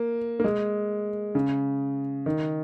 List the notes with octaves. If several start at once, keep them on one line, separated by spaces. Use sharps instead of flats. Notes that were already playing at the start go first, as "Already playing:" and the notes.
Already playing: A#3
A#3
G#3
C#3
D#3